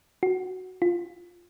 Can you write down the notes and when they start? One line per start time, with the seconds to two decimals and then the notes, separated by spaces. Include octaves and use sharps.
0.23 F#4
0.82 F4